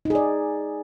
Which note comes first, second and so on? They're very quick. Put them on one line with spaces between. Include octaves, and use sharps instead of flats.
D#4 G#4 D5